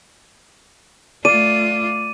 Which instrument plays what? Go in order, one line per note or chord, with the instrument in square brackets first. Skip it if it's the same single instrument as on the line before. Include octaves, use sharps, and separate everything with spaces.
[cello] A3 F4 [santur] D5 [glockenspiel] D#7